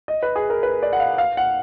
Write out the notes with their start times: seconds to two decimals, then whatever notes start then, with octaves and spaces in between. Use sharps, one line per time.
0.08 D#5
0.23 B4
0.36 G#4
0.50 A#4
0.63 B4
0.82 D5
0.93 F#5
1.00 F5
1.18 F5
1.37 F#5